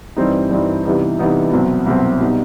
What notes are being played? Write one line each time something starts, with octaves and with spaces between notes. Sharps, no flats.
G2 E3 G3 C4 D#4
G2 E3 G3 C4 D#4
C3 E3 G3 B3 D#4
C3 E3 G3 B3 D#4
C2 B2 F#3 C4
C2 B2 F#3 C4
B2 G3 D#4